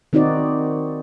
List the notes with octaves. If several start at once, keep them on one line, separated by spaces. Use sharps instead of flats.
D#3 C4 D#4 F#4 D5